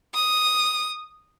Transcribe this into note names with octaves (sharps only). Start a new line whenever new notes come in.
D#6